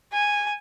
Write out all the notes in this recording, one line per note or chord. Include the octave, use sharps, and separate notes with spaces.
G#5